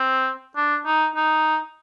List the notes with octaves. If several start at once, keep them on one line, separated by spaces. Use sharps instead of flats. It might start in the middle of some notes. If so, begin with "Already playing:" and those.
Already playing: C4
D4
D#4
D#4